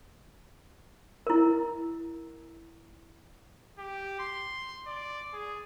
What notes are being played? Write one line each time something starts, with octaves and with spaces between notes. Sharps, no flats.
E4 A#4
G4
C6
D5
G#4